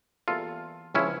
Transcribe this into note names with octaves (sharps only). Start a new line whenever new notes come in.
E2 E3 G3 A#3 F4 A4
C#2 C#3 F3 C#4 E4